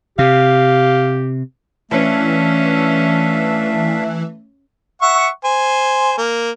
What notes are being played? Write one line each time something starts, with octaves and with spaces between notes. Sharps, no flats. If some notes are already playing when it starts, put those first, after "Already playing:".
C3 G4 F5
E3 A3 C#4 D4 E5 F5
E5 F#5 C#6
C5 G#5
A#3